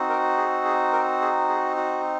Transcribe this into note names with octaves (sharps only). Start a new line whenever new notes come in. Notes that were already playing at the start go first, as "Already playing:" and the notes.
Already playing: C4 D#4 F#4
A#4
G#4
G#4
A#4
G#4
G#4
F#4